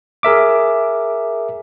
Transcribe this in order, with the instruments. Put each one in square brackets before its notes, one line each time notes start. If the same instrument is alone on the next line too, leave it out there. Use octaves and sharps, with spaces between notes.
[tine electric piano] G#4 A#4 E5 D6